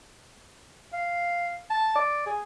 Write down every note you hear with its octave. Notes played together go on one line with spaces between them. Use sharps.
F5
A5
D5
G#4